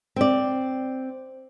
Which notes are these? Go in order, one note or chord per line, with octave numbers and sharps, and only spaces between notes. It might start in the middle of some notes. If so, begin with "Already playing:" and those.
C4 D5